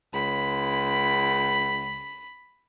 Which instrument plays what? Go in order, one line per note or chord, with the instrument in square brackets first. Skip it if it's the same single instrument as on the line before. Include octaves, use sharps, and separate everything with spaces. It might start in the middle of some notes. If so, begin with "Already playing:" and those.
[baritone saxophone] C#2 [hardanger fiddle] B5